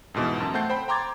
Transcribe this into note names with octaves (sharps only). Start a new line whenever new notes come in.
F2 G#2 B2 E3
F#2 A5
A3 C4 F#5 A5 G6 C7
C5 G5 B5
G5 A#5 C6 D6 G#6 A6